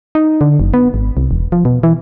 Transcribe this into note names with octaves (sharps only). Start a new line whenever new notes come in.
D#4
D3
F#1
B3
G#1
C2
E1
F3
B2
E3